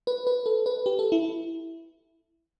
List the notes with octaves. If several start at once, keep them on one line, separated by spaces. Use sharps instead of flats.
B4
B4
A4
B4
G4
A4
E4